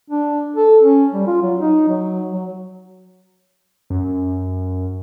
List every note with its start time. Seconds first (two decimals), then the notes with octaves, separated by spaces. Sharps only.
0.11 D4
0.56 A4
0.82 C#4
1.13 G3
1.27 F4
1.42 F#3
1.61 D#4
1.88 F#3
2.32 F#3
3.90 F#2